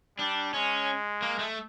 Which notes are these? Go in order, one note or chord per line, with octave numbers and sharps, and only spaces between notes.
G3 D4
G#3 C#4
A#3
A3